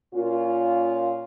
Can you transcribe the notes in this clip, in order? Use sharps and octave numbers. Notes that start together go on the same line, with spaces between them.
A#2 A#3 C#4 F4